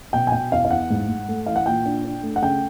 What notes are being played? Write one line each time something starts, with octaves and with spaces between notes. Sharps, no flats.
B2 G5
G#5
B2 G5
E2 F5
F5
E2 F#5
G#2
G#2
A3
E3 F5
F#5
A#2 G5
D4
D4
A3
F#5
C#3 G5